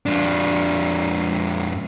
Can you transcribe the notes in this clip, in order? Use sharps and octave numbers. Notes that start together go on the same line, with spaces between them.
F2 D4